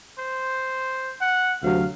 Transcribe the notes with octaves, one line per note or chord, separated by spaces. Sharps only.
C5
F#5
D2 C3 F#3 F5